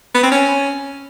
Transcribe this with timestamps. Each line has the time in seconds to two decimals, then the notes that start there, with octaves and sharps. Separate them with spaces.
0.15 B3
0.23 C4
0.32 C#4